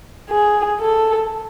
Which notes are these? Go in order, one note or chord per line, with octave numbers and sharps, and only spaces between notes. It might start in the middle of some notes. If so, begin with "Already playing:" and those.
G#4
A4